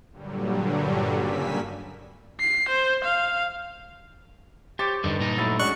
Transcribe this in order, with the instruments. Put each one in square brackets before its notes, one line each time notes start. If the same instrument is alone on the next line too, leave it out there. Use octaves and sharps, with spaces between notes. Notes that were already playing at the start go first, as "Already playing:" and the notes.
[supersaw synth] G2 A#2 D3 F#3 G3
G2 C#3 A#3 G#5 E6 B6
[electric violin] C7
C5
F5
[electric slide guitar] G4 [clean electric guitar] C5 C#5 [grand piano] D6 A6
[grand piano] G2 [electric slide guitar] D3 D#4
[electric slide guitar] A#2 D#4
[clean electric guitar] F#3 E4 [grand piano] A3 A6
[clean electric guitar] G#3 C#4 F#4 [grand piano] D4 [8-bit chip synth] C#6 F#6